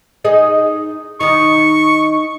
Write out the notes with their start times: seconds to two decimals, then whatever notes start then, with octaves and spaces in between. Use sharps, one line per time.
0.25 D#4 G#4 D#5
1.21 D#3 D#4 C#6